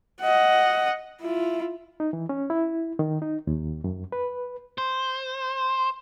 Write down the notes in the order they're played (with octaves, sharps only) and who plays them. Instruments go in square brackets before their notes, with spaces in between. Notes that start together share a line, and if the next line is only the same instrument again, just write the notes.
[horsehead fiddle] D#5 F#5
E4 F4
[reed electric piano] D#4
E3
C#4
E4
D#3
D#4
D#2
F#2
B4
[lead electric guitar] C5